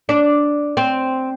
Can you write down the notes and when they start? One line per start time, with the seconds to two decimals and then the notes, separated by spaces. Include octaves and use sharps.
0.09 D4
0.77 C4